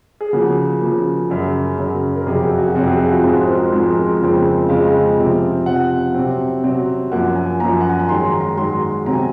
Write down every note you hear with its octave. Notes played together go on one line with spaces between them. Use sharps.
G#4
C#3 F3 A#3 F#4
C#3 F3 A#3
F#2 C#3 F#3 A#4
F#2 C#3 F#3
A#4
F2 C3 F#3 G#4
F#4
F#4
F2 C3 F#3 F#4
G#4
F#4
F4
G#2 F3 G#3 C4 F#4
C5
A#4
G#2 F3 G#3 C4 G#4
A#4
F2 C#3 F3 G#3 C4
F2 C#3 F3 G#3 C4 F5
C3 F3 C4
C3 F3 C4 F#5
C3 F#3 C4
C3 F#3 C4
F#2 F3 A#3 F#5
G#5
F#2 F3 A#3 A#5
F#5
G#5
A#5
G#2 D#3 F#3 C6
A#5
A#5
G#2 D#3 F#3 C6
C3 F#3 C4 A#5
G#5